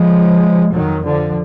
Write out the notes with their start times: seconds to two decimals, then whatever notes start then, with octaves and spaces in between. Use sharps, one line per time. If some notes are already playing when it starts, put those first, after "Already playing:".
Already playing: F3 G#3
0.72 F2 D#3 F#3
1.04 D3 F3